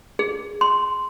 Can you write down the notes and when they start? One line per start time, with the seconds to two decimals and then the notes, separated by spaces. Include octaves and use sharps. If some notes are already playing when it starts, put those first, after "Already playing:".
0.19 G#4
0.61 C6